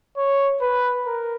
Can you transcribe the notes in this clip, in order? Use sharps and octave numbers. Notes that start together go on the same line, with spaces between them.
C#5
B4
A#4